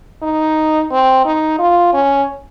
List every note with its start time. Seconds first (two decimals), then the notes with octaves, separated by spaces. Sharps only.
0.23 D#4
0.91 C4
1.25 D#4
1.59 F4
1.93 C#4